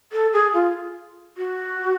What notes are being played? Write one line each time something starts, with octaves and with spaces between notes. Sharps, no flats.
A4
G#4
F4
F#4